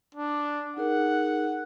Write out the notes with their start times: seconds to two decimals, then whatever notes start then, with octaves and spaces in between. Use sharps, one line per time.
0.15 D4
0.77 D#4 G#4 A#4 F#5